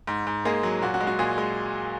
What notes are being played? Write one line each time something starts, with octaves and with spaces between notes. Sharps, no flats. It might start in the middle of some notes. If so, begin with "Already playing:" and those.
G#2
G#2
G#3 A#3 G#4
F#3
A#2 F#4
F#4
G#3
F#4
A#2 G#3 G#4
G#3